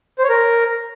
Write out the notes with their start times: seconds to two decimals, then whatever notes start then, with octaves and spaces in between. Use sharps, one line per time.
0.19 C5
0.24 C#5
0.29 A#4